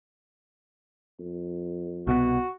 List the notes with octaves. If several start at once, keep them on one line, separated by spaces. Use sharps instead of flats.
F2
C2 B2 B3 F#4